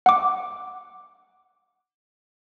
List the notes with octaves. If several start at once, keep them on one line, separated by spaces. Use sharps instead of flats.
F#5 D6